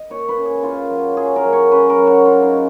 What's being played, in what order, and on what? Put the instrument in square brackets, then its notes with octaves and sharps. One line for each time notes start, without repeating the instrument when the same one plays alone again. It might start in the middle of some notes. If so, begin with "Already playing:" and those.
Already playing: [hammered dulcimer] D#5
A#2 C#5
B4
C#4
G#4
A#2 F4
F#3
F#3 G#4
A#4
F#3
C#5
C#4 B4
A#4
F#3
F#4
C#3 F4
D#4
C#4